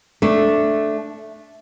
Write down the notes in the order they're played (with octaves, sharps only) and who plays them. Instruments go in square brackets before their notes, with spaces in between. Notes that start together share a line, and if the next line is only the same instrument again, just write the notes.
[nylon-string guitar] A3 D4